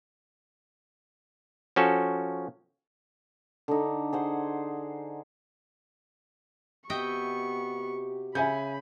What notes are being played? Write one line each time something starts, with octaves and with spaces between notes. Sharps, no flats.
F3 C#4 F#4 A4
D3 D#4
G#4 C5 F#5
C3 B3 F#4 G4 D#5 E5 G5 C#6
C#3 E5 G#5 B5 G6